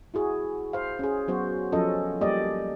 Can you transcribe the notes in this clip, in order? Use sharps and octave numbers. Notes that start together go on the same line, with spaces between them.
E4 F#4 G#4
C5 F5
C#4 G#4
F#3 B3 F#4 C5
F3 F#3 C#4 F4 A4 D#5
G3 A#3 G4 D5 D#5